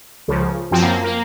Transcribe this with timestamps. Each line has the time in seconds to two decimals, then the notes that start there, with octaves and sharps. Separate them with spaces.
0.28 C#2 C#3 F3
0.71 F#2 F3 C4
0.82 A#3
1.04 A#3